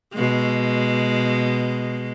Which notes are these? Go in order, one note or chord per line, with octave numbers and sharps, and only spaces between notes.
B2 G#3